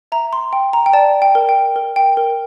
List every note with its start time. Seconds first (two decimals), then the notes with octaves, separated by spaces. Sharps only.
0.12 E5 A#5
0.33 C6
0.53 G5
0.73 A#5
0.86 G5
0.93 D5 A5
1.22 G5
1.35 A#4
1.49 G5
1.76 A#4
1.96 G5
2.17 A#4